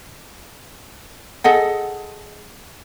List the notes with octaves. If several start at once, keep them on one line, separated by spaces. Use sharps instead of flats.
G#4 A4 D#5 F#5